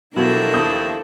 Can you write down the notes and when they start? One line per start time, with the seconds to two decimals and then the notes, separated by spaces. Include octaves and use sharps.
0.16 G2 B2 F3 F#3 D4 E4 A4 A#4
0.53 D#2 D#6 G6